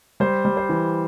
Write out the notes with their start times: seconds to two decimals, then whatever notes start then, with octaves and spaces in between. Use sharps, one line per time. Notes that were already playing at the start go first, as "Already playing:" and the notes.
0.20 G3 C5
0.45 G3
0.57 C5
0.69 E3